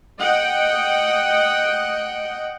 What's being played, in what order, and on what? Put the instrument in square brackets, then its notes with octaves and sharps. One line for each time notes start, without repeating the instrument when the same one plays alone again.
[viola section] D#5 F#5 G5